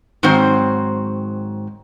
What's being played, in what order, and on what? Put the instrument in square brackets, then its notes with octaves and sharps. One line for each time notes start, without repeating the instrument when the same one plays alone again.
[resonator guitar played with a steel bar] G#2 D#3 F#3 C4 C5